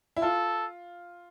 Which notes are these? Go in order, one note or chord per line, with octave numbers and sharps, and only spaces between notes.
E4
F4 A4